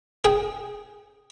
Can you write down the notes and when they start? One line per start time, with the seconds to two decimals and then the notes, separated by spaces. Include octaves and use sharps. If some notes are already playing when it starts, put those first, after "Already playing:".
0.25 G#4 G5